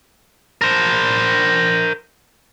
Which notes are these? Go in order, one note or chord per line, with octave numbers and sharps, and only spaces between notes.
A#4 C5